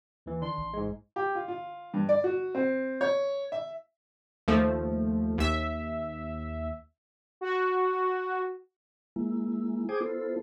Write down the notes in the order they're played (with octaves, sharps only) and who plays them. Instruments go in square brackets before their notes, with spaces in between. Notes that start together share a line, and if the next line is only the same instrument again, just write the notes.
[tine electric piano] D#2 E3
[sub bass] D#3 [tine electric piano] D4 [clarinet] C6
[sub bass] A1
[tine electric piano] G#2 G#3
[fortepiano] G4
F4
F4
G2
D5
F#4
C4
C#5
E5
[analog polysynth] D#2 F3 A3
D#2 E5
F#4
[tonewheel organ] G#3 A#3 E4
G#4 C5 G5 G#5 D6 D#6
B3 E4 F4 A4 C5